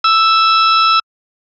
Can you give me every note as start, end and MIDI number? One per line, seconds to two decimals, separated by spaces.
0.04 0.99 88